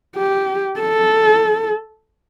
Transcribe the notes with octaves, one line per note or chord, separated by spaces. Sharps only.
G4
A4